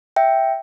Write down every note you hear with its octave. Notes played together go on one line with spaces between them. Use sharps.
E5 G5